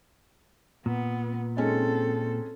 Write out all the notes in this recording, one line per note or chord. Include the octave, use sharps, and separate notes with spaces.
A#2 B3
G#3 C4 C#4 D#4 A4